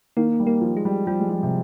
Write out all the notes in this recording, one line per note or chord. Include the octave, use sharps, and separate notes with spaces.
D#3 A#3
G3
A#3
F3
G#3
G3
F3 G3
G#3
G3
C3